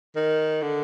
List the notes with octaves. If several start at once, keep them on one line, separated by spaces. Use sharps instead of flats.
D#3
D3